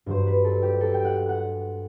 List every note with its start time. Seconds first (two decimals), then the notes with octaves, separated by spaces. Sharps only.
0.06 G2 F#3 C5
0.26 B4
0.44 A4
0.62 G4
0.81 A4
0.94 G5
1.05 F#5
1.29 F#5